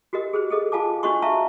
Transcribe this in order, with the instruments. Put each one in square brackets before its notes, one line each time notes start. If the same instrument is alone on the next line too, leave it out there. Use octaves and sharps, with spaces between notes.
[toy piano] F#4 G4 A#4 D#5
G#4 B4 C5
G#4 A4 D#5
F4 F5 G#5 A5 D6
D4 F#4 B4 D#5 C6 C#6
B4 E5 F5 A5 A#5 C#6